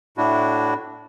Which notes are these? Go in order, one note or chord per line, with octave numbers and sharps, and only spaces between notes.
A2 D4 E4 F#4